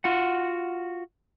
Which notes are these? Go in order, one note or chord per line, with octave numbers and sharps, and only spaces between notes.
F4 F#4 F#5